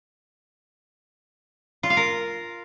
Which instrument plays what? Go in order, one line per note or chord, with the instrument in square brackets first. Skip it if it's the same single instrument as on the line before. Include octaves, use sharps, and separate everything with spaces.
[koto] F4
F5
A#4